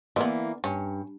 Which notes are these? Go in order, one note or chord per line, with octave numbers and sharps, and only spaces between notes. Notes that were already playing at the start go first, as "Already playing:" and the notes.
D3 E3 A#3 B3
G2 C#4